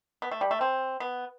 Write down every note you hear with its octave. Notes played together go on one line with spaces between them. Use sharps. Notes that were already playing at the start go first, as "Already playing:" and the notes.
B3
A3
G3
A3
C4
B3